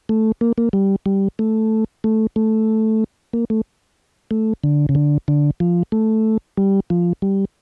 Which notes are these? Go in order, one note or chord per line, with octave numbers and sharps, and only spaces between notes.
A3
A#3
A#3
G3
G3
A3
A3
A3
A#3
A3
A3
D3
C#3
D3
D3
F3
A3
G3
F3
G3